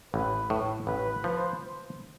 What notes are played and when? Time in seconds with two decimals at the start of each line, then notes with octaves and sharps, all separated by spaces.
0.14 A1 B4
0.50 A2
0.87 A1 B4
1.12 B4
1.24 F3
1.37 C5